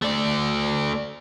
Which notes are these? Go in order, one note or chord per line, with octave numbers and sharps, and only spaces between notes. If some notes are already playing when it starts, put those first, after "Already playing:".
A3 D5